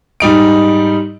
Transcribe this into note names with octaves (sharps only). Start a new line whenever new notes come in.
G#2 G3 D#4 D7